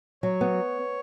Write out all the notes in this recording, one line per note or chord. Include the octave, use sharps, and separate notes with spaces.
F#3 C#5
B3